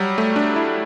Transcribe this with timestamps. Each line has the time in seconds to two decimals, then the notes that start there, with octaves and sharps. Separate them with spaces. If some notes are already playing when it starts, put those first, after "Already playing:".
Already playing: F#3 G3
0.18 A3
0.36 D4
0.56 E4